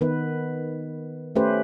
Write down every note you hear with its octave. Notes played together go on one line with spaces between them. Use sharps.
D#3 B3 B4
A3 C#4 G4 B4 C5